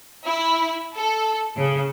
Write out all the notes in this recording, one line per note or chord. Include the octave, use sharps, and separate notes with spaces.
E4
A4
C#3